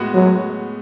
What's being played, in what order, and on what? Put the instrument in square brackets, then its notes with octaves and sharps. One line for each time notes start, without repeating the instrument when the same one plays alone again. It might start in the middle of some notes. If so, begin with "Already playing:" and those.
Already playing: [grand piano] A2 G#3 B3 F#4
[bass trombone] F#3